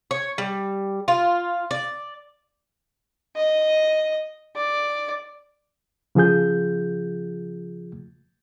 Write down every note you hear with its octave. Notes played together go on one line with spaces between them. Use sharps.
C#5
G3
F4
D5
D#5
D5
C#3 F3 F4 G#4 G6